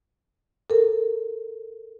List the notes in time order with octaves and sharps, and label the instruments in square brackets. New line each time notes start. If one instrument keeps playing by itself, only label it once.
[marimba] A4 A#4